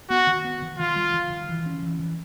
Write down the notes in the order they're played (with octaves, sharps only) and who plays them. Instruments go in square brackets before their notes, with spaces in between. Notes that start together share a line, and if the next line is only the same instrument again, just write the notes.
[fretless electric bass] B3 [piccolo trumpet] F#4
[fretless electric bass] D#3
B3
D#3
[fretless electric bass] D#3 [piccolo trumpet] F4
[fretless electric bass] G3
D#3
D#3
E3
C#4
E3
E3